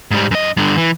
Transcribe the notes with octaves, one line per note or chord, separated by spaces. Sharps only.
G#2 G3
F#2 D#5
G2 D3
E3